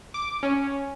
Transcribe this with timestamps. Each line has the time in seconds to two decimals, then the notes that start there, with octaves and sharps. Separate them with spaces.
0.14 D6
0.43 C#4